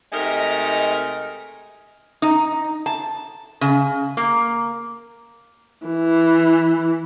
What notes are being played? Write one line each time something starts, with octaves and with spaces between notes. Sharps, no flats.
C3 G#3 A3 D#4 A#4
D#4
A5
C#3
A#3
E3